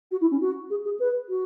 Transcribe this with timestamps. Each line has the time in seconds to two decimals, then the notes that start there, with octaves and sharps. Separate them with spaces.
0.11 F#4
0.21 E4
0.31 C#4
0.41 F#4
0.70 G#4
0.85 G#4
1.00 B4
1.29 F#4